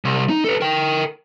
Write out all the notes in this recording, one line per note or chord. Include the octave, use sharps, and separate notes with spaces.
C2
D#4
A4 B4
A#4 G5